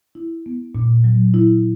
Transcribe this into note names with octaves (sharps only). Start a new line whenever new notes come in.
E4
B3
A#2
F#3
E4